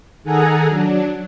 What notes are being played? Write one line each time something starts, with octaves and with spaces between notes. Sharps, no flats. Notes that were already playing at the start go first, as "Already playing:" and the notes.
D#3 G#4 A4 F#5 G#5 A#5
F#3 D4